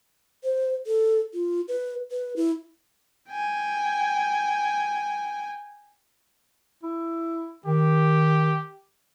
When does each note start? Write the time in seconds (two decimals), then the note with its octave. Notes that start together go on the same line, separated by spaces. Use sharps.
0.44 C5
0.86 A4
1.34 F4
1.68 B4
2.11 B4
2.36 E4
3.30 G5 G#5
6.83 E4
7.66 D#3 G4